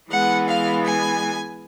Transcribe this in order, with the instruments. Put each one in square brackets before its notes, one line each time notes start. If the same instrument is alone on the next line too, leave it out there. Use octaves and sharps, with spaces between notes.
[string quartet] E3 G#3 B3 F#5
F5
G#5